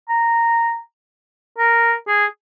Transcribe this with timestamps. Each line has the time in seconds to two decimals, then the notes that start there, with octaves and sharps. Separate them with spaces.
0.09 A#5
1.58 A#4
2.07 G#4